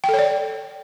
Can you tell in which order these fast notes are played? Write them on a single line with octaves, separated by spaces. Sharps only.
G5 A4 C#5 D5